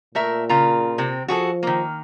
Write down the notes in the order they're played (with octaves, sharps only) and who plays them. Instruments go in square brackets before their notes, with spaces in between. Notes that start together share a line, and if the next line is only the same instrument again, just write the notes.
[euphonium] A#2 [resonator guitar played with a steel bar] A3 A#4 E5
[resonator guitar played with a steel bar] C#3 F4 A#5
C3 C4
[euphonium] F3 [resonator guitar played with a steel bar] F#4 G#4 A4
[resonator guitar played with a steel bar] D#3 A#3